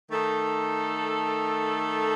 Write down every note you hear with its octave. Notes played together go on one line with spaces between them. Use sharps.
D#3 A3 D#4 A4